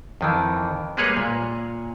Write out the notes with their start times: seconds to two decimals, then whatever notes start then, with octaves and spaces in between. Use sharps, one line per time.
0.21 F2 D#3 E3
0.97 G3 G#3 A#3 G#4 B4 C#5
1.17 A#2